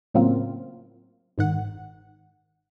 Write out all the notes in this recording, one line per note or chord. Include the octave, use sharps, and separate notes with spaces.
A2 C#3 F#3 A#3 C4 F4
G1 G#2 D#3 F#5